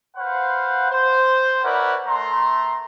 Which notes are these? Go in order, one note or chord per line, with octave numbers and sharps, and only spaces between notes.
B4 C5 F5 F#5
C5
E4 A#4 B4 C#5 D5 F#5
A3 A#5 C6